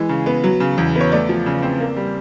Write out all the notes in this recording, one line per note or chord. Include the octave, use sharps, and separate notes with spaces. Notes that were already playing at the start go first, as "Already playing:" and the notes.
Already playing: E3 G#3
C#3
B3
F#3
C#3
E2
B3
C#5
A3 D5
F3
C#3
C4
A#3
G3